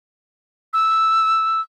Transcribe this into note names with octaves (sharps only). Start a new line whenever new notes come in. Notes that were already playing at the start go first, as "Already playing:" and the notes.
E6